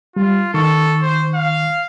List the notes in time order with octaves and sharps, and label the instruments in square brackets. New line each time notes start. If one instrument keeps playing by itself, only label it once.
[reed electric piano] G3 [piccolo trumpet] F4
[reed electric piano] D#3 C#6 [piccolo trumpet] A4
[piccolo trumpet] C5
F5